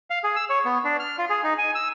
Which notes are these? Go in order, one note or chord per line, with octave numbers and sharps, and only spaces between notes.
F5
G#4
E6
C#5
B3
D4
F6
F4
G#4
D#4
G#5
E6